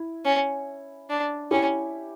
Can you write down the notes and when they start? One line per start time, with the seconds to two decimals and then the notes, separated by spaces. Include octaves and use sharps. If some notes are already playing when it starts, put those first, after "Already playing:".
Already playing: E4
0.25 C#4
1.09 D4
1.51 C#4 E4 G4